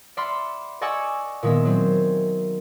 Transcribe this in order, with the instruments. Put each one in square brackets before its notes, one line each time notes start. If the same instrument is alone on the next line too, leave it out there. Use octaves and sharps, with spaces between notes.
[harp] D5 E5 F#5 B5 C6 F6
D5 D#5 F#5 G#5 C#6 E6
A#2 D#3 G#3 B3 E5
F#3 C4